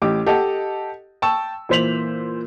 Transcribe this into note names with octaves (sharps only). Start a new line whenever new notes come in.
A1 G4 D6
G4 A4 D#5 F#5
G5 A5 C#6 E6
A#2 E3 C5 B6 F7 F#7